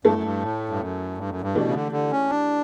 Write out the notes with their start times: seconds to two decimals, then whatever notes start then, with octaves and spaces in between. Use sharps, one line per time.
0.05 G2 A3 E4 A4
0.14 F#2
0.23 G2
0.42 A2
0.69 G2
0.80 F#2
1.18 G2
1.29 F#2
1.41 G2
1.55 B2 E3 A3 D4 G4 D5
1.68 C#3
1.74 D3
1.92 D3
2.11 C#4
2.30 D4